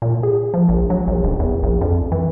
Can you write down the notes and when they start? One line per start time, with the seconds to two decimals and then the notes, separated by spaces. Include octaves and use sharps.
0.02 A#2
0.23 G#4
0.54 F3
0.69 A#1
0.90 F#3
1.07 A#1
1.24 D#1
1.39 E2
1.63 A#1
1.81 F2
2.12 E3